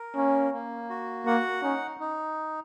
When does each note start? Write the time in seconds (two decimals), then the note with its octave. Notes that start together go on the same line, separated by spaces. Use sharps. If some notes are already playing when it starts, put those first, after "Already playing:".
Already playing: A#4
0.16 A#3 C#4
0.53 A#3
0.90 F#4
1.26 A#3 F#5
1.63 C#4 D#4
2.00 D#4